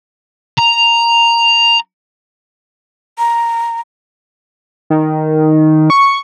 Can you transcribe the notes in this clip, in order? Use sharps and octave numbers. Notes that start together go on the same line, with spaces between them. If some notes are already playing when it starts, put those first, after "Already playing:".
A#5
A#5
D#3
C#6